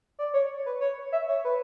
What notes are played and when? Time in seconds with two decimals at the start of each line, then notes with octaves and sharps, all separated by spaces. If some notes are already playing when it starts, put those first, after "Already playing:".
0.19 D5
0.34 C#5
0.66 B4
0.81 C#5
1.12 E5
1.28 C#5
1.45 B4